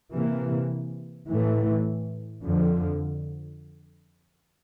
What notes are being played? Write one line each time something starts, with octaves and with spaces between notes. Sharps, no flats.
C3 E3 A#3
A2 E3 A3
F2 D3 F3